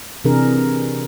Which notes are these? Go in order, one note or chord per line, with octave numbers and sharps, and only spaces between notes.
C3 E3 D4 G#4 A#4